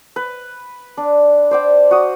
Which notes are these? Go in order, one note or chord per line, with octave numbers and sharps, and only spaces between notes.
B4
D4
C5 D5 G5
F#4 D#6